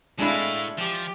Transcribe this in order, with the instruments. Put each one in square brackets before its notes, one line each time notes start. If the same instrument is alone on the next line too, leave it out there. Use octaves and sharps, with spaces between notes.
[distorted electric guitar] A2 [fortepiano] G#3 D4 B5 [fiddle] E4 F5
[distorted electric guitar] F3 [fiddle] G4